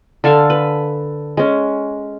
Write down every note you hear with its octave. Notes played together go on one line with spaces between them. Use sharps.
D3 A4 F5 G#5
B4
G#3 C#4